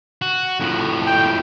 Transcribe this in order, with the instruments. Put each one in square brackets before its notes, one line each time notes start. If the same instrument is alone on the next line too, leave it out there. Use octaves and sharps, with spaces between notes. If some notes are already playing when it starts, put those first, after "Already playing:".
[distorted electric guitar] F#4
F2 A2
[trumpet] G5